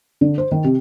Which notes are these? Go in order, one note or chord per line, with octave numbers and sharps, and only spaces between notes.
D3
C5
D#3
C3